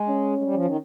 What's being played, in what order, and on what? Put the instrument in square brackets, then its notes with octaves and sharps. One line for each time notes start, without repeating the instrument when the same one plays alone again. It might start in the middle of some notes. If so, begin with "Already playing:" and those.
Already playing: [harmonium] G#3
[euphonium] C#4
[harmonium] G#3
G3
F3
D#3